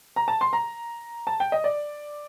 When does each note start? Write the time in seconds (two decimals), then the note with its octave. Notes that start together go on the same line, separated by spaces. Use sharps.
0.16 A#5
0.28 A5
0.41 C6
0.53 A#5
1.27 A5
1.40 G5
1.52 D#5
1.64 D5